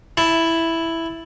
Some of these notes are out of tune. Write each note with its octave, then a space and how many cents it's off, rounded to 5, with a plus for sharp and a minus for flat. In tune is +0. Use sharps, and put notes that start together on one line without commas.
E4 +0 A5 +0